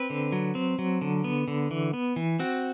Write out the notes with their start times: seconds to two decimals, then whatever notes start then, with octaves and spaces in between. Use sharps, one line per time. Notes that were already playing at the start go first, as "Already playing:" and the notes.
Already playing: C4 B4
0.10 D3
0.32 F#3
0.55 C4
0.79 F#3
1.01 D3
1.24 B3
1.48 D3
1.71 E3
1.93 B3
2.16 E3
2.39 C4 F#4